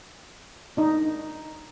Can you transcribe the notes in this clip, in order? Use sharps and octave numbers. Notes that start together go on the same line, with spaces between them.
D4 D#4